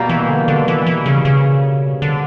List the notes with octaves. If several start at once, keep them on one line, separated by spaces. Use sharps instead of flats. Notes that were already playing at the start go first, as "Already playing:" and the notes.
Already playing: B2 G3 A#3
E3
D3
D3
E3
E3
C#3
C#3
D3